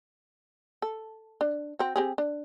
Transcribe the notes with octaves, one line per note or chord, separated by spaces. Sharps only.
A4
D4
C4 F#4
C4 G4 G#4
D4